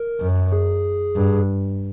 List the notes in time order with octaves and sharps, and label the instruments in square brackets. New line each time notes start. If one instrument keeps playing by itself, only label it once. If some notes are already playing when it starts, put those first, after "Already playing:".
Already playing: [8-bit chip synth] A#4
[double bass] F#2
[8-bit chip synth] G#4
[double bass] G2